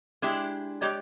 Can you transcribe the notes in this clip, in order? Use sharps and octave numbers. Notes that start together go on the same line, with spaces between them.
G#3 D4 E4 G4
G#3 G4 C#5 D5